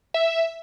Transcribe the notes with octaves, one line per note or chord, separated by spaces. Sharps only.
E5